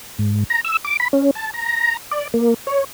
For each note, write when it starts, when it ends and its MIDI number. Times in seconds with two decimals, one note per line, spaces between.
0.19 0.44 44
0.50 0.61 82
0.65 0.77 88
0.85 0.97 86
1.00 1.08 83
1.13 1.31 61
1.35 1.51 81
1.54 1.97 82
2.11 2.27 74
2.34 2.54 58
2.67 2.84 73